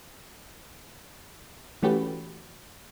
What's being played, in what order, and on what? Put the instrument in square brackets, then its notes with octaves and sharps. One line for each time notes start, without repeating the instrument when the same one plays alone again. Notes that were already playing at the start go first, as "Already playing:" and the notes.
[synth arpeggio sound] E3 A3 C#4 F#4 G4 B4